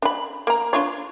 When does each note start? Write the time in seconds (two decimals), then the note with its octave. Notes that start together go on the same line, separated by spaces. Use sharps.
0.02 D4 B5
0.47 A#3 A#5
0.73 D4 F4 C#5